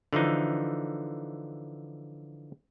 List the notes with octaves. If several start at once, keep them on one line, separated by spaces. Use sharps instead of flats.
D3 E3 F3 D#4